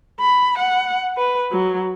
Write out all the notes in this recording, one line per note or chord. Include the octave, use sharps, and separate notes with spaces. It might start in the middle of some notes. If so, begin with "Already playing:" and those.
B5
F#5
B4
F#3